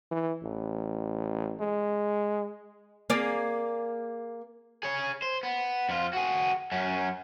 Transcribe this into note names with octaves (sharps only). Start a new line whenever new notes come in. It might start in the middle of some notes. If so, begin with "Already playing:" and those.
E3
A1
G#3
A#3 G#4 D5
G#4 C#5
C5
B3
F2 F4
F#4 G#4
F#2 C#4